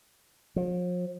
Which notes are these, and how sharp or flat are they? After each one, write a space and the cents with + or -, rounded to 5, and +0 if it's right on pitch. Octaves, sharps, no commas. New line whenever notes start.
F3 +40